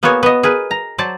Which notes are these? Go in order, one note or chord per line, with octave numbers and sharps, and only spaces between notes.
A#3 B3 F#4 G#4 C#5 G#5
B3 D#5
G#4 A#4 B4
A#5
F#3 C5 D5 A5